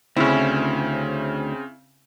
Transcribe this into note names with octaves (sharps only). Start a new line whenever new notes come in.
D2 C#3 C4 C#4 E4